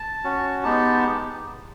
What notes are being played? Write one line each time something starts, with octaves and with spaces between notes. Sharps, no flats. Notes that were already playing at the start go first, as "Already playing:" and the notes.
Already playing: A5
C#4 F#4
G#3 B3 D#4 G4 A5